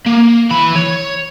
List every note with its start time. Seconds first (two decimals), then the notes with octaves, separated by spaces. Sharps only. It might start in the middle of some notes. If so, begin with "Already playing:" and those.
0.06 A#3
0.51 E3 B5
0.76 C#5